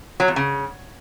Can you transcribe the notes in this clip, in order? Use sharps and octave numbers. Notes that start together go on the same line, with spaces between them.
F#3
E2
C#3